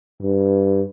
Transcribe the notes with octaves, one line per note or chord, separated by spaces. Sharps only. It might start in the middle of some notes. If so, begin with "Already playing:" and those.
G2